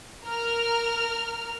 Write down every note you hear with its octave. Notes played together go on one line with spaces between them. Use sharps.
A#4 F6